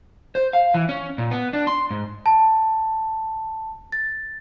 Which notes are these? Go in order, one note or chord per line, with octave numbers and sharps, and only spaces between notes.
C5
F5
E3
C#4
A#2
B3
D4
C6
G#2
A5
A6